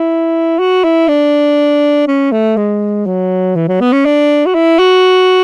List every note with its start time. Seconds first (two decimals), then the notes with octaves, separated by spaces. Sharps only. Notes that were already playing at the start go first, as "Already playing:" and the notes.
Already playing: E4
0.59 F#4
0.84 E4
1.08 D4
2.08 C#4
2.32 A3
2.57 G#3
3.06 F#3
3.56 E3
3.68 F#3
3.80 B3
3.93 C#4
4.05 D4
4.46 F#4
4.55 E4
4.79 F#4